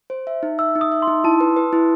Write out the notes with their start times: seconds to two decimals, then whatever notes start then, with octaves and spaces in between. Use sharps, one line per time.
0.10 C5
0.27 E5
0.43 D#4
0.59 E5 E6
0.75 D#4
0.81 D#6
0.92 E5
1.02 C6
1.08 D#4
1.24 E4 A5
1.40 B4
1.57 B4
1.73 E4